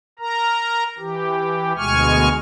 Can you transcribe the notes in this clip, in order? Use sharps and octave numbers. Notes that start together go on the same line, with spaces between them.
A#4 A#5
E3 G4
D2 B2 G#3 G#5 C#6 F6